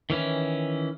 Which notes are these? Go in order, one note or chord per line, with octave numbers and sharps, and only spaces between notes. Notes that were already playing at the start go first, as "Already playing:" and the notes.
D#3 E3 C#4 E4